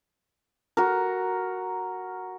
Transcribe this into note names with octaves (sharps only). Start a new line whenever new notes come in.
F#4 A#4